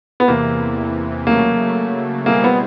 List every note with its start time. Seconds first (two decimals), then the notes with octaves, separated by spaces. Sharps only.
0.20 B3
0.28 E2 C3 E3 A#3
1.27 C#3 F#3 A3 A#3
2.26 B2 G3 A#3 C4 E4 G#4
2.44 B3